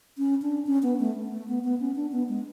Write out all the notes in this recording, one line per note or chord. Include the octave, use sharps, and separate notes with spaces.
C#4
D4
C#4
B3
A3
A3
B3
B3
C#4
D4
B3
G#3